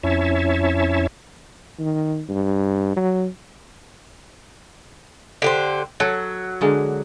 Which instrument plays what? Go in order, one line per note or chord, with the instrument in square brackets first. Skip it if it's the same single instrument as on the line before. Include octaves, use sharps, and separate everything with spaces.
[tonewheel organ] F2 C#4 E4 C#5 E5 A5
[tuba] D#3
G2
F#3
[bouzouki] D3 G4 C5
[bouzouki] F#3 [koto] A4
[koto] D3 G#3 A#3